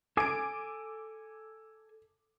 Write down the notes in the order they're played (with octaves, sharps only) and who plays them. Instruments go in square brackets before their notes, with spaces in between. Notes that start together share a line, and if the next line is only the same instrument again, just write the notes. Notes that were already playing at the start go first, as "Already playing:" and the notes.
[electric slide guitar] A4 G#5 [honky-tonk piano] D6 D7